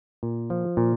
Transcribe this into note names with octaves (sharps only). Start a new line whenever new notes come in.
A#2
F3
A#2